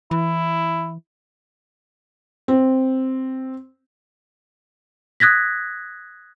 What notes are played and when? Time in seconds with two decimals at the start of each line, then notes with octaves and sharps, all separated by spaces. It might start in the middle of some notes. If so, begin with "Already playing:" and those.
0.11 E3 E4
2.48 C4
5.20 D#6 F#6 G#6 A#6 B6